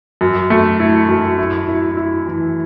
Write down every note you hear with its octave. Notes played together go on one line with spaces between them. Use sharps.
F#2
A3
E4
F#2
E4
E4
E4
E3